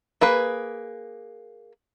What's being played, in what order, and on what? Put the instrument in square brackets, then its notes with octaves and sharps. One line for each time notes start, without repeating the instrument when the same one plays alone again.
[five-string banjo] A#3 G#4 B4